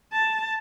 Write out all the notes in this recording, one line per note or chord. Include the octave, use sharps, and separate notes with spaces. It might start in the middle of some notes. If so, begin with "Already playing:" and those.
A5